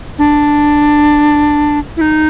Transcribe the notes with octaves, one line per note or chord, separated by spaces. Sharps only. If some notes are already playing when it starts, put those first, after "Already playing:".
D4
E4
D#4